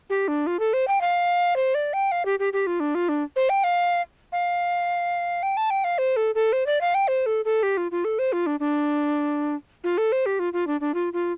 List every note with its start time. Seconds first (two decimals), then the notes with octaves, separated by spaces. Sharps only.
0.10 G4
0.28 D4
0.47 F4
0.60 A4
0.73 C5
0.88 G5
1.01 F5
1.56 C5
1.75 D5
1.93 G5
2.12 F5
2.25 G4
2.39 G4
2.53 G4
2.67 F4
2.80 D4
2.95 F4
3.09 D4
3.36 C5
3.49 G5
3.64 F5
4.32 F5
5.43 G5
5.57 A5
5.70 G5
5.84 F5
5.98 C5
6.16 A4
6.35 A4
6.53 C5
6.66 D5
6.81 F5
6.95 G5
7.08 C5
7.26 A4
7.45 A4
7.63 G4
7.77 F4
7.92 F4
8.05 A4
8.19 C5
8.33 F4
8.46 D4
8.60 D4
9.84 F4
9.98 A4
10.12 C5
10.26 G4
10.39 F4
10.53 F4
10.67 D4
10.81 D4
10.94 F4
11.13 F4